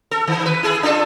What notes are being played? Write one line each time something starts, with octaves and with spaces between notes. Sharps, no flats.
A4
D#3
B4
E4 G#4 A4
D4 F4 A4